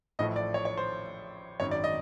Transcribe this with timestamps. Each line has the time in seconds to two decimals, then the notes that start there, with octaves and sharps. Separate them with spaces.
0.19 A1 A2 F3 A3 D#5
0.36 D5
0.54 C#5
0.65 C#5
0.77 C5
1.60 G#1 F#2 D#3 C#5
1.71 D5
1.84 D#5